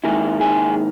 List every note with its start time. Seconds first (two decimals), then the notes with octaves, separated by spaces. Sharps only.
0.04 G#2 D#3 A#3 E4 G#4
0.41 G#4